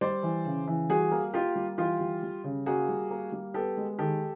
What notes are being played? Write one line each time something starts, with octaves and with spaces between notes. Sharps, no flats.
G3 C5 D5
E3
C#3
E3
G3 F#4 G#4
A#3
A#3 F4 G4
G3
E3 F4 G4
G3
G3
C#3
A#3 F#4 G#4
G3
A#3
G3
B3 G4 A4
G#3
D#3 G4 A4